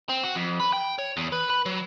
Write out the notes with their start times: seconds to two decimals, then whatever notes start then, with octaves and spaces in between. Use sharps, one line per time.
0.09 C4
0.23 F#4
0.35 F2
0.60 B4
0.73 G5
0.99 C#5
1.17 E2
1.32 B4
1.50 B4
1.66 F#3